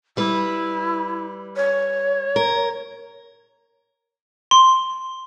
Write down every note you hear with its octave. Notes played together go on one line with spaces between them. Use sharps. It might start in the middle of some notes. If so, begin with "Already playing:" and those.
G3 E4 B4
C#5
A#4
C6